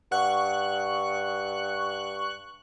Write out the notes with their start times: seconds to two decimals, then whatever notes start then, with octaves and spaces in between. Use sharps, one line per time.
0.12 G2 F#5 C#6 F#6